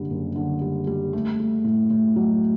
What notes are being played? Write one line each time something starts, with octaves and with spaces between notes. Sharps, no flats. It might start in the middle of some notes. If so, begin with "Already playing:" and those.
Already playing: F#1 D3 G3
F#1
D3
G3
G3
A3
A3
A2
A2
F#3